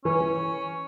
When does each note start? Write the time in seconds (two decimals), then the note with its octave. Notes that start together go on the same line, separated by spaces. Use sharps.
0.05 E3 C#4
0.20 E3